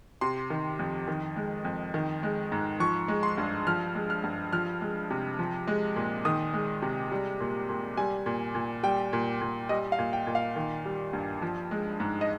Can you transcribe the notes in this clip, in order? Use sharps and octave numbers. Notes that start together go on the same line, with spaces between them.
C3 C6
D#3
F2
D#3
G#3
F2
D#3
G#3
G#2
F3 C#6
G#3
C6
G2
F3 F6
G#3
F6
G2
F3 F6
G#3
C3
F3
G#3
A#2
D#3 D#6
G#3
C3
G3
A#2
A#2
G3 G#5
A#2
A#2
G3 G5
A#2
A#2
G3 D#5
F5
A#2
G5
A#2
F5
D#3
G3
G2
F3
G#3
G#2
D#5